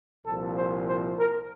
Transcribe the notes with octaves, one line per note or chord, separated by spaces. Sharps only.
C2 A#2 F3 A4
C5
C5
A#4